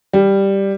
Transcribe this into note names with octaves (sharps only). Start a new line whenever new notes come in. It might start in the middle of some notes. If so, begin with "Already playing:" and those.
G3